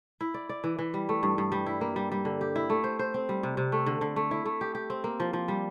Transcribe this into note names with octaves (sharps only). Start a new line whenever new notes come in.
E4
D5
D5
E3
E3
G3
A3
G2
G2
G3
E4
A#3
G3
G3
D3
G4
E4
A3
C5
C5
C4
G3
C3
C3
A3
D3
D3
A3
E4
A3
G4
G4
C4
A#3
F3
F3
G3